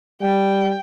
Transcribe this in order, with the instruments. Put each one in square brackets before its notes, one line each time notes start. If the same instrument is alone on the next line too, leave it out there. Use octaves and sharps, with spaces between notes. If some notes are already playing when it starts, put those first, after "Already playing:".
[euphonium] G3 [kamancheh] G5